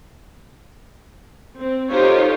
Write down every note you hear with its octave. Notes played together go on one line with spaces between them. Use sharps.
C4
D#4 F4 G4 A4 C5 C#5